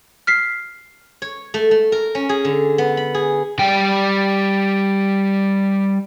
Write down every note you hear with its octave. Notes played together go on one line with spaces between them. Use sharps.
F6 B6 C7
C#5
A3
A3
A#4
C#4
G#4
D3
B3
B5
G#4
G3 G5